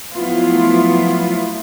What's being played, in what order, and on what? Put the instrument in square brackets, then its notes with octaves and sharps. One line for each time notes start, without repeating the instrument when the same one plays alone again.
[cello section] F3 F#3 A3 B3 E4 F4